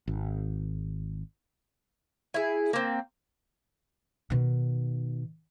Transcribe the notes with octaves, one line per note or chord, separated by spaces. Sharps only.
G#1
E4 G#4
A#3 C4
B2 D#3